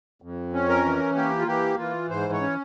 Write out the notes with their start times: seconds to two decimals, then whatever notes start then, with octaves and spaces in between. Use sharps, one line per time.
0.22 F2
0.53 C#4
0.69 A#4
0.85 E3
1.16 A#3 G4
1.39 F4
1.47 E3 G4
1.79 E3 F4
2.10 G#2 C5
2.33 C#5
2.41 C#4